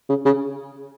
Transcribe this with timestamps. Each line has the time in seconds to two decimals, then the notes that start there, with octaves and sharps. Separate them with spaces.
0.09 C#3
0.25 C#3